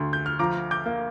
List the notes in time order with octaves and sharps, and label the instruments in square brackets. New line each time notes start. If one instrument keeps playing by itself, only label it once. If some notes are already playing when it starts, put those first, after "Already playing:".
Already playing: [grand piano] D2 C6
G6
F6
F3 A#5 D6
D6 G6
A#3